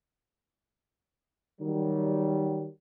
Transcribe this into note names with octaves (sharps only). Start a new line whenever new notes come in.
D#3 F#3 G3